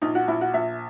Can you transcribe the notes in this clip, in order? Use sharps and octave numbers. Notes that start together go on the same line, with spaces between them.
A#1 D#4
F#4
A#1 E4
F#4
A#1 E5